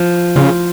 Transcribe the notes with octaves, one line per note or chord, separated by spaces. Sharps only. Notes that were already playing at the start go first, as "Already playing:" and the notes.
Already playing: F3
C#3 F4